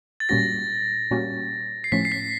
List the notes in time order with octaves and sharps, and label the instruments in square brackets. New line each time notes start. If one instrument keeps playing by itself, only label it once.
[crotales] A6
[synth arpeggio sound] A#2 G3 A#3 C#4 F#4 [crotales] A#6
[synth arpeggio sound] A#2 G3 A#3 C#4 F#4
[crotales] C7
[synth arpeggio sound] A2 F3 A3 C#4 [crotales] B6
[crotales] C7
B6